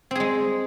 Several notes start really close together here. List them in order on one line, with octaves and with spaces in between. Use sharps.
C4 G#4 G#3